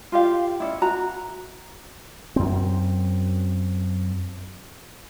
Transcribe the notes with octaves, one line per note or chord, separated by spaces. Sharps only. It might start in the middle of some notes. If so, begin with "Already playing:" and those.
F4 G4 F5
C#4 D4 E4
F#4 A#5
F#2 C4